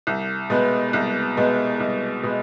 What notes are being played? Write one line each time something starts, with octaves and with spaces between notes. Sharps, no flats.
C2
B2 G#3 B3
C2
B2 G#3 B3
C2
B2 G#3 B3